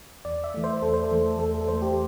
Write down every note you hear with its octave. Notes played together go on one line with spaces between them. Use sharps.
E2 D5
E5
E3 A3
C5
E2 A4
C5
A4
E3 A3
E2 A4
A4
E3 A3 C5
G4